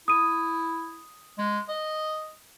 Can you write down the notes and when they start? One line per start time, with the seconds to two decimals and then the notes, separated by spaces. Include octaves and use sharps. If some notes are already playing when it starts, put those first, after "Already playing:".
0.08 E4 D#6 D#7
1.38 G#3
1.68 D#5